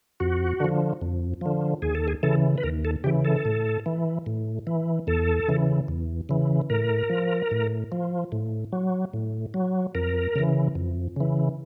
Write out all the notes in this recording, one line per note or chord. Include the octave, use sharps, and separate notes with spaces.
F2 F#4
D3 F3
F2
D3 F3
D#2 G#4
A4
G#4
C#3 E3 A4
B4
D#2 A#4
A4
C#3 E3 G4
A4
A2
E3
A2
E3
E2 A4
C#3 E3
E2
C#3 E3
A2 A#4
F3
A2
F3
A2
F#3
A2
F#3
F2 A#4
C#3 E3
F2
C#3 E3